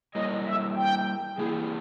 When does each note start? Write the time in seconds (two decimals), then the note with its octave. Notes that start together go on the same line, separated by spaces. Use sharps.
0.15 G3 A#3 E4 A#4 C#5 D#5
0.46 E5
0.76 G5
1.37 E3 A#3 E4 G#4